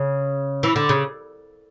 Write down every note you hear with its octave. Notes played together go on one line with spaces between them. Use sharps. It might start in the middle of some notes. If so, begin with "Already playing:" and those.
Already playing: C#3
E3
D3
C#3